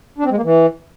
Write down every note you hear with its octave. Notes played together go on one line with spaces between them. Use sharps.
D4
C4
G#3
A#3
E3